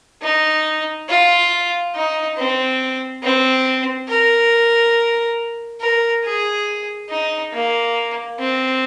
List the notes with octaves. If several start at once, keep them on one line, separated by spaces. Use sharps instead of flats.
D#4
F4
D#4
C4
C4
A#4
A#4
G#4
D#4
A#3
C4